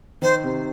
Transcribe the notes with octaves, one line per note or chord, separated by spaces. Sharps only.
D#3 C5
C3